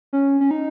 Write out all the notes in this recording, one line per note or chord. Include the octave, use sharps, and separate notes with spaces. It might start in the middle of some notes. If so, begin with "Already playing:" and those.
C#4
C#4
D#4